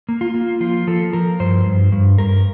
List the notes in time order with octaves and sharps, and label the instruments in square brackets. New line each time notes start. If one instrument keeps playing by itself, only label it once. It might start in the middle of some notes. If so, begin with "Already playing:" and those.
[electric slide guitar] A#3
F4
A#3
F3 F4
F3 A4
F3 A#4
G2 C5
G2
G2
G2 A#4